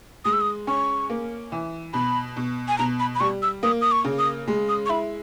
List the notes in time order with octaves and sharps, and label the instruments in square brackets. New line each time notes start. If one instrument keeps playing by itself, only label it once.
[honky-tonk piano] G#3 [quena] D#6
[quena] E6
D#6
[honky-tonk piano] C#4 [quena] C#6
[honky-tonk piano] A#3
E3
[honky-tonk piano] B2 [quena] B5
[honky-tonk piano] B2
[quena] G#5
[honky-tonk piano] B2 [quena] A#5
[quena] B5
B5
[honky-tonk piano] G3 [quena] C#6
[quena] E6
[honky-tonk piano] A#3 [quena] D#6
[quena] D#6
C#6
[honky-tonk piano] C#3
[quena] D#6
[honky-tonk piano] G#3
[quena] D#6
C#6
[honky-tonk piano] E4 [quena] B5